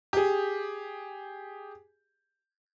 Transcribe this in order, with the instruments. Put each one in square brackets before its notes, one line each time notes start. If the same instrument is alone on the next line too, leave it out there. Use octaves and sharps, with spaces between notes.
[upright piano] G4 G#4